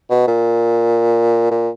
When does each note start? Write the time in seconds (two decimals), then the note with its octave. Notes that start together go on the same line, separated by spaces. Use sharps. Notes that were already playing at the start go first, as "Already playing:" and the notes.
0.10 B2
0.27 A#2
1.51 A#2